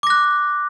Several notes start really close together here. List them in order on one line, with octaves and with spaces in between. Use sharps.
D6 A#6 F#6